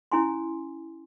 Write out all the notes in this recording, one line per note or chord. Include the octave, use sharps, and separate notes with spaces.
C#4 E4 G#5 C6